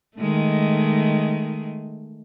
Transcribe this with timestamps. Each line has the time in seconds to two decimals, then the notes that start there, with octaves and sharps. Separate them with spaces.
0.18 D#3 G#3 A3